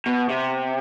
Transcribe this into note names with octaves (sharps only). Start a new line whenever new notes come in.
B2
C3